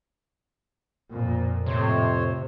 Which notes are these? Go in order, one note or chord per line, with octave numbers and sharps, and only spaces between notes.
F2 A#2
F2 A2 C3 C5 C#5